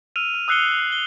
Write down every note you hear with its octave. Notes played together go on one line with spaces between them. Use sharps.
E6 F6 D#7 F7
F6
D#6 E6 F#6 C7 C#7 G7
C7
G7